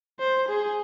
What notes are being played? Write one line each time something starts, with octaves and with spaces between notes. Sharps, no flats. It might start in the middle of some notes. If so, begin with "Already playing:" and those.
C5
G#4